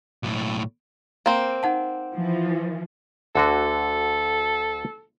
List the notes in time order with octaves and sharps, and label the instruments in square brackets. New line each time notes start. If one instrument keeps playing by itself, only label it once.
[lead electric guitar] B1 A2
[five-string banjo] A#3 C4
[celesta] D#4 F#5 A5
[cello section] E3 F3
[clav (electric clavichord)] D2 D3 F#4 [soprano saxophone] A4